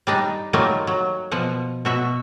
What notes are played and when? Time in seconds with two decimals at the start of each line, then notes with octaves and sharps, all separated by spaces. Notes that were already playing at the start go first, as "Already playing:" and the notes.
0.07 G3 D4 D#4
0.53 F#3 G3 A3 A#3 D#4 F4
0.87 F#3
1.31 B2 F3 F#5
1.85 B2 F#4 E5